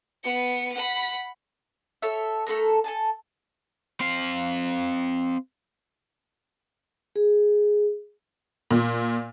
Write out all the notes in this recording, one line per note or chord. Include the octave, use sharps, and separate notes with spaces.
B3 C#7
F#5 B5
A4 C#5 E5
A3 C4 A4 A#4
A4 G#5 A5
C4 F5
G#4
A#2